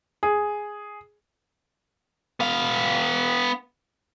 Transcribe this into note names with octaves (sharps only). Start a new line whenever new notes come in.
G#4
B3 F5